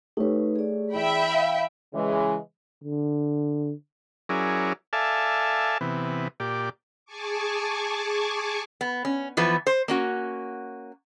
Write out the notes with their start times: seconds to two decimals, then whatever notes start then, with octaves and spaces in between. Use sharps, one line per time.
0.17 A3 D#4 G4 B4 C#5
0.56 G#4 D5
0.94 E3 E5 G5 B5
1.33 F5
1.93 C#3 E3 G#3
2.84 D3
4.29 F#3 C#4 E4 G#4 A#4 D5
4.93 A4 D5 E5 F5 G#5 A5
5.81 C3 E3 B3
6.40 A#2 G4 D5
7.05 G#4 G#5 A5 C#6 D6
8.81 B3
9.05 C#4
9.37 E3 F3 B3 B4
9.67 C5
9.88 A#3 C#4 F#4